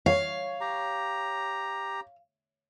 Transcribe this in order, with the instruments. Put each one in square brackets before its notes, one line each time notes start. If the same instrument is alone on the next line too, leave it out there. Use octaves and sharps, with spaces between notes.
[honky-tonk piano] C#5 [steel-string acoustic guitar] F5
[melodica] G4 A#5